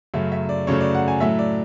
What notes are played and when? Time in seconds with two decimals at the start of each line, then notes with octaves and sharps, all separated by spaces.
0.14 F#2 C#3 F#3 A3 E5
0.32 E5
0.49 D5
0.67 F#2 C#3 F#3 A3 C#5
0.80 D5
0.94 F#5
1.08 G#5
1.21 A2 F#3 A3 E5
1.39 D5